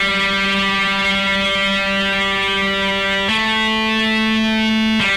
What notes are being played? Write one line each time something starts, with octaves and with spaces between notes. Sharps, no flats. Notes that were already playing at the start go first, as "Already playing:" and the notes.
Already playing: G3
A3
G3